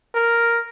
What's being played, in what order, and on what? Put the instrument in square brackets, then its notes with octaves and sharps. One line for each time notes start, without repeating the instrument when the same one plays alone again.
[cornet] A#4